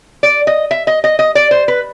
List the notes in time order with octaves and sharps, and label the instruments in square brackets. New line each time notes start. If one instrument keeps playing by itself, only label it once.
[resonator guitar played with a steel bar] D5
D#5
E5
D#5
D#5
D#5
D5
C5
B4